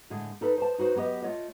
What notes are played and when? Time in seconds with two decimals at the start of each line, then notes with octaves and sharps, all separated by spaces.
0.10 A2 D3 G#3 A3
0.41 D#4 A4 B4
0.58 C5 A5
0.78 D#4 F#4 B4 C5
0.95 F#3 B3 G4 D#5
1.23 A3 F4 C#5 D#5